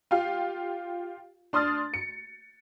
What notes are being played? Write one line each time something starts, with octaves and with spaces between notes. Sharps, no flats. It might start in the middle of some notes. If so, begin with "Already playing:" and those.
F4 G4 F5
D4 C6 D#6 F6 A6
C#7